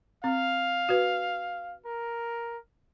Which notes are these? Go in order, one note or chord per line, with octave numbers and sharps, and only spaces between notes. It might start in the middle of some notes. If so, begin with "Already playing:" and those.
C4 F5
F#4 B4
A#4